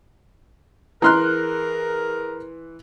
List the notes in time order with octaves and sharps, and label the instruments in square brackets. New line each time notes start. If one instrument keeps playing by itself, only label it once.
[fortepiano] E3 C6 [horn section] G#4 A#4 [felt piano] A#5 F6 F#6